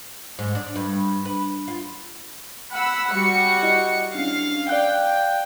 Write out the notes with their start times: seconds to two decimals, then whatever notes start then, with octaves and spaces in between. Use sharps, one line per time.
0.39 G#2
0.55 D4
0.76 G2
1.25 B4
1.68 F4
2.72 F#5 B5 E6
3.12 G3 F#4 C#7
3.63 E4 D#5
4.15 C#4 D4 F5
4.69 D5 F5 G5 F#6